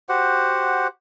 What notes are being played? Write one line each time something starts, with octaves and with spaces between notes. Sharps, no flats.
F#4 G4 C5 F#5